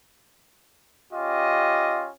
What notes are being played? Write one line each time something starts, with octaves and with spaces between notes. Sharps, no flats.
C#4 F4 G4 D#5